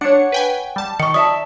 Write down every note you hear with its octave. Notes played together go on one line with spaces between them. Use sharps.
D4 C#5 F#5 C#7
B4 G5 G#5
G3 A5
D#3 C#6 C#7
D5 E5 A5 D#6